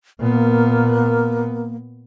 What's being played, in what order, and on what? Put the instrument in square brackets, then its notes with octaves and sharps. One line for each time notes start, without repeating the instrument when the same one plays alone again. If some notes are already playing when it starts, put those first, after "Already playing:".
[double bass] A#2 B3 [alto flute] A#3